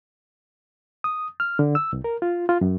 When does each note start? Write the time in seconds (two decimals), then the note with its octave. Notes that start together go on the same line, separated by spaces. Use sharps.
1.04 D#6
1.40 F6
1.59 D3
1.75 E6
1.93 C2
2.04 A#4
2.22 F4
2.49 F4
2.61 F#2